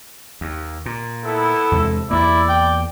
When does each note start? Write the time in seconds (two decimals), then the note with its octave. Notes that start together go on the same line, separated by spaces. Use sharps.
0.41 D#2
0.86 A#2
1.25 B3 E4 A4
1.71 E2 C3 G#3
2.11 E2 A#3 E4 D5
2.49 G5